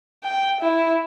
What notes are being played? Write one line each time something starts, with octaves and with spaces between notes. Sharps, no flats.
G5
E4